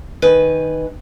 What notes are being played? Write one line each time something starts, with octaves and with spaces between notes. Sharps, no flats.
D#3 B4 G#5